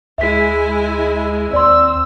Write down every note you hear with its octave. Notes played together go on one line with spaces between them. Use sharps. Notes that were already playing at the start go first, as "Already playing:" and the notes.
D2 G#3 E4 E5 G#5 B6
D#2 C4 D5 C6 E6